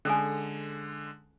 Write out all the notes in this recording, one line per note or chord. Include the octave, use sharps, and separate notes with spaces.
D3 G#3 C#4 A4 G#5